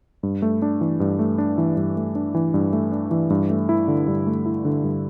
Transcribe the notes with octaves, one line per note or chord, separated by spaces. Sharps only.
G2
A3
D4
E3
G2
A3
D4
E3
G2
A3
D4
E3
G2
A3
D4
E3
G2
A3
E4
D3
G2
A3
E4
D3
G2